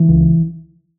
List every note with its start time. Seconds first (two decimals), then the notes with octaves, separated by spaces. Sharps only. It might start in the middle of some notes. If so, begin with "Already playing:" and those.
Already playing: E3
0.09 C#2